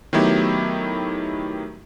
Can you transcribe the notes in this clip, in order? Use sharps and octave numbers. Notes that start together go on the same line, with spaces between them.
D#3 F#3 A3 B3 E4 G4